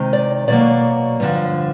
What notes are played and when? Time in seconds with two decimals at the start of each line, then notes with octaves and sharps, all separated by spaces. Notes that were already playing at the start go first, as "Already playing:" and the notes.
Already playing: C3 D#3 G#3
0.13 D5
0.48 B2 F#3 A#3 D5
1.20 G2 D3 F3